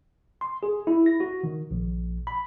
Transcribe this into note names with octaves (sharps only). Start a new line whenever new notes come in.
C6
G#4
E4
A#6
F#4
D#3
A#1
B5